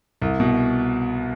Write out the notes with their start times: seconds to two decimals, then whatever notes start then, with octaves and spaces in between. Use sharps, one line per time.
0.22 C2
0.40 B2